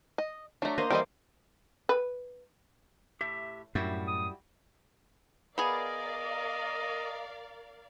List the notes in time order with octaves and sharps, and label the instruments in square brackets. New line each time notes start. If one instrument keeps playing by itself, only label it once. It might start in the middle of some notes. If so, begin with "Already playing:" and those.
[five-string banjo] D#5
[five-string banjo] F#3 A3 [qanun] D4 A#5
[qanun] A#3 C5 D#5
[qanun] E3 E4 D6 [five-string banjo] G3 C5 D#5
[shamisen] B4
[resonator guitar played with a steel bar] A2 [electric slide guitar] G4 E5
[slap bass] F#2 [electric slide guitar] A2 [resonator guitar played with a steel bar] G3 E4 F#4
[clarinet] D#6
[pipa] B3 G#4 [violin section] A#4 D5 F5 [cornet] D#5